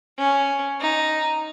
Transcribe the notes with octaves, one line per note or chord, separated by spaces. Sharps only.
C#4
D#4